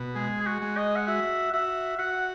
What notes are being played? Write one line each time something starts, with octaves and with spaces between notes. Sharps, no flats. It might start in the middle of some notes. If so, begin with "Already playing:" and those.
Already playing: B2
G#3 G#4
G#4
F#4
G#3
D#5
F#5
F#4 E5
F#4 E5
F#4 F#5